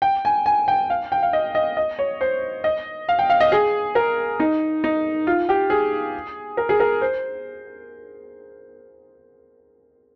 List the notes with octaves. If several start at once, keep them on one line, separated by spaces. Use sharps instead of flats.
G5
G#5
G#5
G5
F5
G5
F5
D#5
D#5
D#5
C#5
C5
D#5
F5
G5
F5
D#5
G#4
A#4
D#4
D#4
F4
G4
G#4
A#4
G#4
A#4
C5